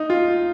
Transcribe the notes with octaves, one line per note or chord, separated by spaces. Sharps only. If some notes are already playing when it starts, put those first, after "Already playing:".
Already playing: D#4
F4